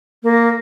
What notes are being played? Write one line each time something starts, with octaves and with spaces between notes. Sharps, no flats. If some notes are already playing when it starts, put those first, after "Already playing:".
A#3